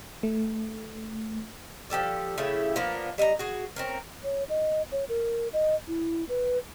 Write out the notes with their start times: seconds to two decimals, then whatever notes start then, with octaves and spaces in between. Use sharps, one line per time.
0.23 A3
1.90 F3 G4 A4 D5
2.38 C#3 A3 E4 G4
2.76 F3 A#3 B3 D4
3.18 G3 D#5 F5 A#5
3.39 F#4 G#4
3.76 C4 C#4 A#4
4.24 C#5
4.49 D#5
4.92 C#5
5.09 A#4
5.53 D#5
5.88 E4
6.29 B4